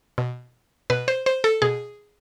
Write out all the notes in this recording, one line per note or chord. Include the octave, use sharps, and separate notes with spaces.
B2
B2 B4
C5
C5
A4
B2 G#4